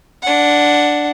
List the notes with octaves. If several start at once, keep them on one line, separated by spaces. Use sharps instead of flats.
D4 F#5